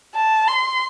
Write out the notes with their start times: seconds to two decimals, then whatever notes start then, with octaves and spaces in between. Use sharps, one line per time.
0.15 A5
0.48 C6